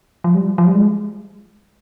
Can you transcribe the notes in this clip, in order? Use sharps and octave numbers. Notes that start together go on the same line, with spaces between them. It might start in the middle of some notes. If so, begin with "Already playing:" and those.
F3
G3
F3
G3
G#3